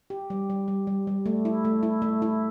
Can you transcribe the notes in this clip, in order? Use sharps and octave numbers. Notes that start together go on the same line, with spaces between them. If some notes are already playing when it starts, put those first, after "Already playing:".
G4
G3
G3
G3
G3
G3
A3
E4
A3
E4
A3
E4